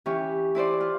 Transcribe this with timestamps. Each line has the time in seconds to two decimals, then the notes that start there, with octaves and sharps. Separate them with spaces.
0.06 E3 C#4 G4 C#6
0.55 E4 B4 C5 D5
0.80 F4